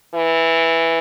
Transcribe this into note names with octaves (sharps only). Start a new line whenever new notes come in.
E3